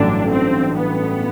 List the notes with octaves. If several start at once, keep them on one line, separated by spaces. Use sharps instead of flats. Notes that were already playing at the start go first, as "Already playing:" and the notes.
Already playing: A1 G2 D3 F#3 A3 D4
C4
B3